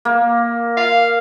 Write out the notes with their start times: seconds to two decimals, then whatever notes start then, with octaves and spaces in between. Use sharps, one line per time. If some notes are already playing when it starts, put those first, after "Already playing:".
0.05 A#3
0.77 F5